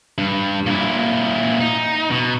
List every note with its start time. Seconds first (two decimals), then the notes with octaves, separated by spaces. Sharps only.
0.18 G2
0.67 A#2 E4
1.61 D#4
2.11 B2